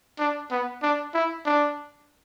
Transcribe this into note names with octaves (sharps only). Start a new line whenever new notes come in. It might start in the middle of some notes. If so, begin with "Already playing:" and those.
D4
B3
D4
E4
D4